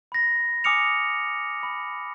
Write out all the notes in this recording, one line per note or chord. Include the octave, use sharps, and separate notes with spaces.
B5 A#6
G#5 D6 D#6 F6 C#7 F7
B5